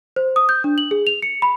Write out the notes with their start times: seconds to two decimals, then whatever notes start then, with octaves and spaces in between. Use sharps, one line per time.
0.16 C5
0.36 D#6
0.49 G6
0.64 D4
0.78 F#7
0.91 G#4
1.07 F7
1.22 C#7
1.42 B5